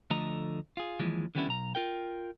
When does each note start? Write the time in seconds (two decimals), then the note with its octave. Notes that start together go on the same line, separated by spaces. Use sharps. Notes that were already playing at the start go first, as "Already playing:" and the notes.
0.10 D2 D3 F3 A3 D#5 A#5
0.77 F4 G#4
1.00 D#2 E3 F3 G#3
1.35 D3 D#3 G3 B3 C#4 E4
1.48 B1 A#5
1.75 F4 A#4 G5